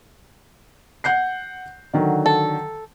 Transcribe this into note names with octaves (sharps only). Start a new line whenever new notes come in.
F#5 G6 C7
D3 D#3 F#3
A4